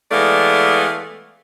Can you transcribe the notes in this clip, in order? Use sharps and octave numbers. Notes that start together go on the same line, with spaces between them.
E3 G#3 A3 B3 D5 F5